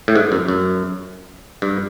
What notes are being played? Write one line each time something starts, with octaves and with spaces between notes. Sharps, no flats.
A2
G#2
F#2
F#2
G2